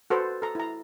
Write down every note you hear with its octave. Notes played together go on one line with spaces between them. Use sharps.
F#4 A4 B4 C5
A4 A#5
E4 A#5